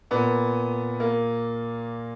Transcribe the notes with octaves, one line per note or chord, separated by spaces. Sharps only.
A#2 B3
A#3